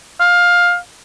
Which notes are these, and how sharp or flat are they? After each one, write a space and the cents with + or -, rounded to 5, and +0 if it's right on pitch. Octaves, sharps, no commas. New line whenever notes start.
F5 +15